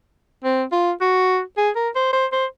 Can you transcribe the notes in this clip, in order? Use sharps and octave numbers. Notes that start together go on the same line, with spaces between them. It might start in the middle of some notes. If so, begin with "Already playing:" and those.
C4
F4
F#4
G#4
A#4
C5
C5
C5